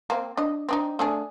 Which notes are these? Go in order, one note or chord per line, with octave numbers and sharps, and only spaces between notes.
A#3 C4
D4 D#5
C4 D4 D#4
A3 D4 G#4